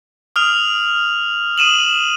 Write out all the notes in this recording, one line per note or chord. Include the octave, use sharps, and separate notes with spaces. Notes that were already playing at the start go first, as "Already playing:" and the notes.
D#6 F6 F7
D#6 D#7 E7 F#7